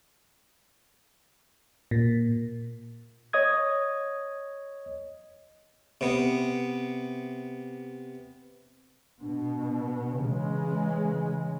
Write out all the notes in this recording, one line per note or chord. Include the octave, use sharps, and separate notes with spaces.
A#2
C#5 D#5 D#6 G#6
C3 B3
B2 D4
C#3 E3 G#3